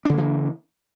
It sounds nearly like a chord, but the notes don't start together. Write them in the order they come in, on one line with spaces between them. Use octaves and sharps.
D4 C#3 A#3 E3